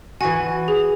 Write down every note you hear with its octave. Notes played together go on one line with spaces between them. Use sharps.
E3 F#4 G#5
G#4